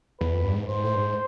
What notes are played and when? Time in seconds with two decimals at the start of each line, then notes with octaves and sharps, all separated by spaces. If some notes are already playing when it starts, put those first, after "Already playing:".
0.21 E2 B4
0.33 F2
0.44 G2
0.56 G#2
0.68 G#2 C5
0.84 A2
0.95 G2
0.99 G#2